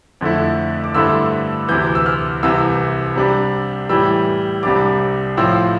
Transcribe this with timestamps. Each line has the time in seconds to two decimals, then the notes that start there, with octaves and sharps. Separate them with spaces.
0.21 F2 D3 A3 E4
0.84 D6
0.95 G2 D3 A3 C4 E4 E6
1.68 D2 C3 E3 G6
1.95 E6
2.06 F6
2.43 C2 C3 E3 E6
3.16 C3 G3 D4
3.89 A2 E3 G3 E6
4.63 C2 C3 G3 D4 D6
5.37 A2 F3 C4 E6